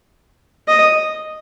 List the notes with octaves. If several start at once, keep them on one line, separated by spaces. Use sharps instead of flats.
D#5